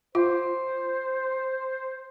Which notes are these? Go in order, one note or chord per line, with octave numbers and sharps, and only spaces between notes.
F4 C5